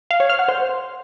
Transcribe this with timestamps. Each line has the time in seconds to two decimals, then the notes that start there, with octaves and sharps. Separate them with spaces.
0.11 F5
0.20 C#5
0.29 F6
0.39 F#5
0.48 C5